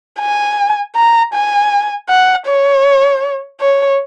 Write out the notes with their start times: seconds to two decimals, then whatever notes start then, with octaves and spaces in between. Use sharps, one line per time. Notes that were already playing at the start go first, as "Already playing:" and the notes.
0.20 G#5
0.96 A#5
1.34 G#5
2.09 F#5
2.48 C#5
3.61 C#5